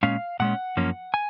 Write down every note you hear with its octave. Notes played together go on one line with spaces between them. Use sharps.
A#2 G#3 C#4 F5
A#2 G#3 C#4 F#5
F#2 F3 A#3 C#4
G#5